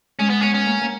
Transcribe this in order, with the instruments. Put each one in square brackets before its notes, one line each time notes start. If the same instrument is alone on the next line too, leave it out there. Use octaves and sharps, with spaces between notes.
[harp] G#3 [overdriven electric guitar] C#4
[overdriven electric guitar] B3
[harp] B3 [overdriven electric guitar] C#4
[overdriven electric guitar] C#4
[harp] A#3
A#3